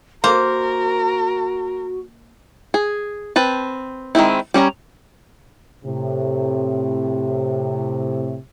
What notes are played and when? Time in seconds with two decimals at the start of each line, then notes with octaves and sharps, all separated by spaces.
0.24 A#3 F#4 A#4 C5
2.74 G#4
3.36 C4 B4 A5
4.15 D#3 G#3 C4 E4
4.54 G3 C#4 C#5 A#5
5.84 A2 C3